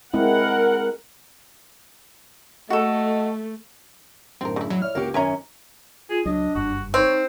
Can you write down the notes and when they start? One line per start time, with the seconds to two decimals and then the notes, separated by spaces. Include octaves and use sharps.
0.14 G#3 C4 E4 A#4 F#5
2.70 A3 F#4 A4 D#5
4.41 F#2 A2 D3 C4 A#4
4.56 C#3 E4
4.70 F#3 E4
4.82 C#5 D5 E5 F6
4.95 C#2 A#3 F#4 G4
5.14 G#1 F#2 C#4 A#4 E5 G#5 A#5
6.10 F4 G#4
6.26 C#2 F#3 D4 D#5
6.55 F#1 G2 F#4
6.94 C4 D#4 C#5